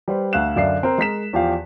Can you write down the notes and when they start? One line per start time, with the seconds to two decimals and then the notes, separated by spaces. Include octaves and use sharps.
0.08 G3 B4 C5
0.33 D2 F5 F#6 E7
0.56 F#2 D3 D5 E5 F5 C7
0.83 C4 A#4
0.98 G#3 A#4 B6 E7
1.33 E2 F3 G4 F5